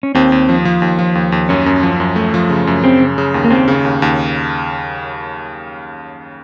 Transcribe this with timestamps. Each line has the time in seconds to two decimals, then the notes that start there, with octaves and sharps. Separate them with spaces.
0.03 C#4
0.15 D#2 C4
0.32 D#2
0.49 F3
0.65 F3
0.82 D#2
0.99 F3
1.15 D#2
1.32 D#2
1.49 F#2 C#4
1.66 F#2
1.83 F3
2.00 F#2
2.16 A3
2.34 F3
2.50 C#3
2.67 F#2
2.83 C#3 C4
3.00 C#3
3.18 C#3
3.34 D#2
3.44 A#3
3.50 D#2 C4
3.68 C#3
3.85 D#2
4.02 D#2